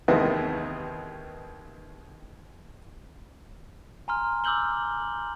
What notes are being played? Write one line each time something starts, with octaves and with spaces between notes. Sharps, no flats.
D#2 C3 D#3 E3 G#3 B3
G#5 A#5 C6 F6
D6 E6 F6 G6 F#7 G7